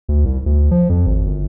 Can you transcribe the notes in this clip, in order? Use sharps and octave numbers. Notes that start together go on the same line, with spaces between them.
D2
C2
D2
F3
F2
G#1
G1